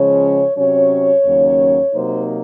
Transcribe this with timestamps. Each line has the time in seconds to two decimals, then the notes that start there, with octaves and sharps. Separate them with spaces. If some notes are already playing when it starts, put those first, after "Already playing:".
Already playing: C#3 F3 G#3 C#4 C#5
0.57 C3 F#3 C#4 C#5
1.25 D#2 C#3 F#3 A#3 C#4
1.94 C3 F#3 A#3 D#4 C5